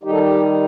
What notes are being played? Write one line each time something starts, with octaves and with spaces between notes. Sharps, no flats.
D#3 G3 D#4 G4
A4
G4